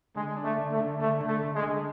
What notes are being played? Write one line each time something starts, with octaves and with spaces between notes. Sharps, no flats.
D3 G#3
D4
A3
D3
A3
D3
D3 A3
D3
A3
D3
G#3
D3